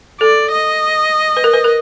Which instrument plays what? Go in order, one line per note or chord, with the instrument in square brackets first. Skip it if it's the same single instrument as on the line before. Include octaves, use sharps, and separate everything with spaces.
[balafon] A4 [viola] D5
[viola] D#5
[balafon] B4
A#4
B4
A#4